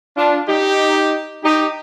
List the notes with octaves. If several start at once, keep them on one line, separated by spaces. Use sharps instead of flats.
D4 F4
D#4 G4
D#4 G4